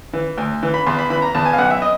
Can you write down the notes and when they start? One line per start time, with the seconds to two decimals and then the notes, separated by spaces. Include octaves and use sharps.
0.13 E3
0.37 D2
0.63 E3
0.74 B5
0.86 E2 C6
0.98 B5
1.10 E3 B5
1.22 A#5
1.35 E2 A5
1.45 G#5
1.53 F5
1.58 B1 F#5
1.71 E5
1.82 D#5